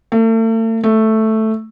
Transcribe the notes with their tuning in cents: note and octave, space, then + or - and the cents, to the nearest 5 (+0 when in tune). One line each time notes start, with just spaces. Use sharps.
A3 +40
A3 +0